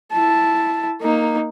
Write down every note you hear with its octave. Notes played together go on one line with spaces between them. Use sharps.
E4 A5
A#3 D#4